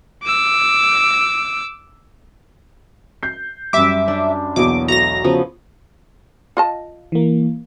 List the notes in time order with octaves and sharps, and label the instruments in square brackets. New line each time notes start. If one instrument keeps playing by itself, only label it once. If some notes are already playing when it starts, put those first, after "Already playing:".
[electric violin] D6 E6
[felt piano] G6 C7
[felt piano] F#2 G3 [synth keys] E5 D6
[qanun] D4
[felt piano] B1 E2 [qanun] F#3 A#3 B3 [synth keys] D6
[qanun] F#3 A3 F#4 [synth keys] A#5 A#6
[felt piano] C#3 [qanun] F3 F#3 B3
[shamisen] F4 D#5 A5
[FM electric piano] E3 A#3